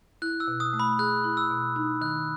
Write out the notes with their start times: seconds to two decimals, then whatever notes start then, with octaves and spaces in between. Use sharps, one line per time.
0.22 E4 F#6
0.40 E6
0.48 B2
0.60 D#6
0.73 A3
0.80 B5
0.99 G#4 F#6
1.24 E4
1.37 E6
1.50 B2
1.76 D#4
2.01 D#3 F#6